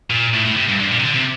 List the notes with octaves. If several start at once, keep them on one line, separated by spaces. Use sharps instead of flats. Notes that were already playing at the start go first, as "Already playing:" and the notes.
A#2
A2
A2
C3
G2
G2
A#2
C3
D3
C3